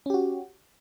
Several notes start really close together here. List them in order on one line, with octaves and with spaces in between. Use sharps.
C#4 G4 F#4